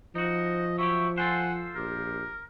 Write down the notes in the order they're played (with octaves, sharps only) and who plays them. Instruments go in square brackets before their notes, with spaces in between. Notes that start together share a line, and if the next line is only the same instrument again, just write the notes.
[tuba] F3 [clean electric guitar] D#4 F#4 [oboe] D#5
[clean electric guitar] F#3 E4 G4 [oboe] E5 [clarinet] C#6
[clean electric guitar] F4 A4 C5 [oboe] F#5 [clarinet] G#5
[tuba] A#1 [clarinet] G4 [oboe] A#4